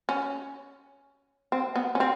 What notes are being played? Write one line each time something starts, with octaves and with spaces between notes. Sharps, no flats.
C#4
C4
B3
C#4
C4